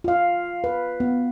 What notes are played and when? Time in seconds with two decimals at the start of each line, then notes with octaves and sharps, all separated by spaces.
0.04 F4 F5
0.64 B4
1.00 B3